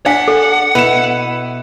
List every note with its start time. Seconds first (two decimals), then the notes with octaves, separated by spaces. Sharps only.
0.06 D4 F5 F#5 G#5 B6
0.28 A4
0.75 B2 E4 B4 E7 F7